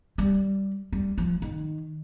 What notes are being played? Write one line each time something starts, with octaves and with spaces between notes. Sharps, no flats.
G3
G3
F3
D#3